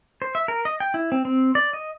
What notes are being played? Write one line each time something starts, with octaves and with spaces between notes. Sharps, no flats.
C5
E5
A#4
D#5
G5
E4
C4
C4
D5
D#5